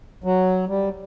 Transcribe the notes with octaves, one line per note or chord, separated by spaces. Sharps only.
F#3
G3